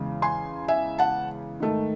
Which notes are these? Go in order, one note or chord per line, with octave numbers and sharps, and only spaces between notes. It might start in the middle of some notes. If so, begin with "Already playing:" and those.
Already playing: E2 C#3 E3 G#3
G#5 C6
E5 G#5
F#5 A5
G#2 D#3 A3